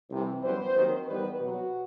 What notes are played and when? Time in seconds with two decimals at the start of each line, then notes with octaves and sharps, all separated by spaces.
0.10 C2 C3 E3
0.43 F#2 E3 G3 B3 C5
0.76 D#2 D#3 F#3 C4
1.07 E2 D#3 G3 B3 B4
1.41 B2 F#3 B3 F#4